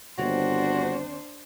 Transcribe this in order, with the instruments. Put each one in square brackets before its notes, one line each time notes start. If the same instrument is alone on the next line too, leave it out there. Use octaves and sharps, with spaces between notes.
[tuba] G1 [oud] D#2 C4 C#5 [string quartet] D4 C5 [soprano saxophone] F#4